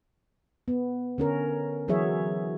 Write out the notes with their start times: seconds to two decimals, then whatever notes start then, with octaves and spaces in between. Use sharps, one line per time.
0.68 B3
1.18 D3 C#4 A#4
1.88 E3 F#3 F#4 G#4 C#5 E5